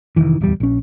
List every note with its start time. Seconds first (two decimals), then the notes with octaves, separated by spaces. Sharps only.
0.16 F1 B1 D#3 E3
0.40 D1 E2 F#3 G3
0.60 A#1 C#4